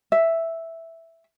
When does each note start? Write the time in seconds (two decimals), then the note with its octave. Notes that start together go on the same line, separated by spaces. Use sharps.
0.12 E5